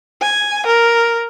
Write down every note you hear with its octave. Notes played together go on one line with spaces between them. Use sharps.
G#5
A#4